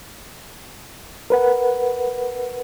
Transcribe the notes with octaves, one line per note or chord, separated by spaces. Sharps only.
A#4 B4 F#5